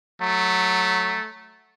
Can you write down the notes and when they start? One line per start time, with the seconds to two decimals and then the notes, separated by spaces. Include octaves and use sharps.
0.21 F#3 A3